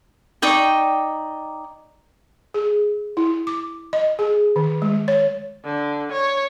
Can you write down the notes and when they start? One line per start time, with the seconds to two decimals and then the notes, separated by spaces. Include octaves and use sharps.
0.42 D#4 D5 G5 C#6
2.54 G#4
3.17 E4
3.47 D6
3.93 D#5
4.19 G#4
4.56 D#3
4.82 G#3
5.08 C#5
5.65 D3
6.12 C#5